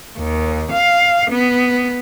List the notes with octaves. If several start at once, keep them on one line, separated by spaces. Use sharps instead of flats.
D#2
F5
B3